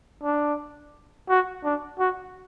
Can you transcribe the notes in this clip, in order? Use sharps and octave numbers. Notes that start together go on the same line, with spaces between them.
D4
F#4
D4
F#4